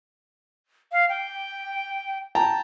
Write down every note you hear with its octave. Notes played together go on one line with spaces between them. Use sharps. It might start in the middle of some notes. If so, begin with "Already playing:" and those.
F5
G5
G5 A5 A#5